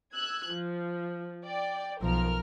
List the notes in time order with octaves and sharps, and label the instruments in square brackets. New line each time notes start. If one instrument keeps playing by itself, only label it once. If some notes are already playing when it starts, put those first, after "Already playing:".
[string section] E6 F#6 G#6
F3
D5 G5
[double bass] B1 F3 [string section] A#4 F6